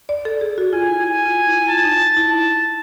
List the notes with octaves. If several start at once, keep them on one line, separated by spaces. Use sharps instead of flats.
D5
A4
G#4
F#4
F4 G#5
E4
G#5
F4
E4
F4 A5
D#4
E4
A5